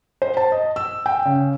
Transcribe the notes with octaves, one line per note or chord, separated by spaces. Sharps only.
C5
A5
D#5
E6
G5
C#3